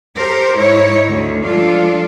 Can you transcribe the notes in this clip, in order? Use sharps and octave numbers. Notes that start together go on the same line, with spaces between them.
G4 A4 A#4 C5
G#2 D#4 E4 C#5
D2 D3
F3 G#3 D4 F4 A4